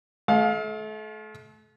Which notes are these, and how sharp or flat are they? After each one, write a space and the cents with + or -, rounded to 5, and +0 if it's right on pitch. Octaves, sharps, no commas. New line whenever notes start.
A3 -35 F5 +25